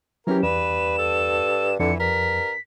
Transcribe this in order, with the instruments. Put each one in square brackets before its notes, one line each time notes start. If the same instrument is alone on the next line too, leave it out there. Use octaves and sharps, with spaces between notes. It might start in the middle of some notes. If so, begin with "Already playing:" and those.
[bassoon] E3 [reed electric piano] F#3 C#4 G4 [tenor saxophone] A#4
[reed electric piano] E2 [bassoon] G2 [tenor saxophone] B4 [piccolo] E7
[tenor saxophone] A4
[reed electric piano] F2 [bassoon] D3 [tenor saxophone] E3 [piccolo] C#7
[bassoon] G2 [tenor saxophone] A#4 [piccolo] B6